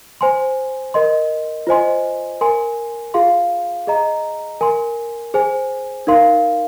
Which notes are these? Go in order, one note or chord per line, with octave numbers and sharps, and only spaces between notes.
C5 G#5 C6
A#4 D#5 C6
F4 C5 D#5 G#5 C6
A#4 G#5 C6
F4 G#4 F5 C6
G#4 D#5 A#5
A#4 G#5 C6
G#4 C5 G#5
D#4 A#4 F5 C6